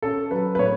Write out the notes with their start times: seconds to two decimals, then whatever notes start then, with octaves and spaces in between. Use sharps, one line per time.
0.02 C#4 A4
0.31 F#3 B4
0.55 B4
0.59 A2 C#5